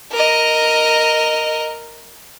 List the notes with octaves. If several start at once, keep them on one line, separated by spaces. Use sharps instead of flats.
A#4 D#5